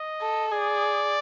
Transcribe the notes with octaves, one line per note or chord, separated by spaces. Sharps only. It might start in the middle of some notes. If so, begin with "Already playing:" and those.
Already playing: D#5
A4
G#4 D5